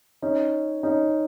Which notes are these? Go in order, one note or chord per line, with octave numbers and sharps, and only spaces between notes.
C#4 D#4
C#4 D#4